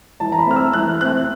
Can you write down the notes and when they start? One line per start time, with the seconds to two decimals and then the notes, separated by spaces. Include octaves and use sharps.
0.20 E3 A5
0.32 A#5
0.39 B5
0.47 A3 C4 F6
0.56 E6
0.73 E3 F#6
1.01 A3 C4 F#6